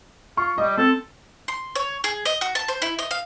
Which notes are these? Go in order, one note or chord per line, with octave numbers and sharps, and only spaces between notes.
F4 C#6
G3 D#5
C4 A4
C6
C#5
G#4
D#5
F#4
A5
C5
E4
D#5
F5